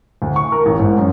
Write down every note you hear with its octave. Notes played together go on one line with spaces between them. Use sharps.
D2
C#6
A#4
A1
G#2
F#2